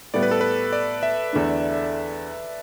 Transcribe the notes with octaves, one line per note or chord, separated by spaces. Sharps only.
A2 G3 B3 D5
B4
A4
B4
D5
E5
E2 D3 A3 D4